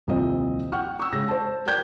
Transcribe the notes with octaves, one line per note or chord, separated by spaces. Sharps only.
D#1 C2 F3 C4 D#5
F#5 G5 C#6 F6
C#6 E6
C#3 G#3 A#6
C5 A5
A#4 D5 G5 G6 G#6